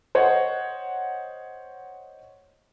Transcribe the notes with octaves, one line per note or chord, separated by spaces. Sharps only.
C5 C#5 D#5 F#5